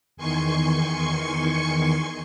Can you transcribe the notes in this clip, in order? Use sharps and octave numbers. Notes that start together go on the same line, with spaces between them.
E2 D#3 G#5 C6 C#6 C#7